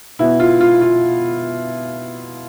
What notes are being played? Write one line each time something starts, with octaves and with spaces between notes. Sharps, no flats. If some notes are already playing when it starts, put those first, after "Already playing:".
B2 B3 E4
F4
F4
F4